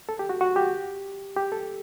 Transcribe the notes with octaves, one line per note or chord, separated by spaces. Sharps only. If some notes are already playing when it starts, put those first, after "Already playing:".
A4
G4
F#4
F#4
G4
G4
A4